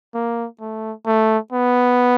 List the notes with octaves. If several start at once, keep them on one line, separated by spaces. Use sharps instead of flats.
A#3
A3
A3
B3